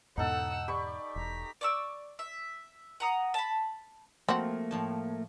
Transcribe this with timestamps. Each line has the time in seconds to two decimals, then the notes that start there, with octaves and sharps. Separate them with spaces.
0.18 E2 G#2 B2 D#4 A4 F#5 E6
0.68 G4 D5 B5 C#6
1.16 E1 A#5 B6
1.61 D5 C#6 E6
2.19 E5
3.00 F#5 A#5 D#6
3.34 A5 B5
4.29 F3 A3 A#3 C4 F#4
4.71 A2 F3 A5